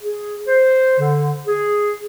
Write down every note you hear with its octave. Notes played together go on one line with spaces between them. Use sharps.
G#4
C5
D3
G#4